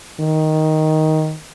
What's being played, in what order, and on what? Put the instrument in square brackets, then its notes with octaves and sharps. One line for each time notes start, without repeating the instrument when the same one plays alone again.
[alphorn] D#3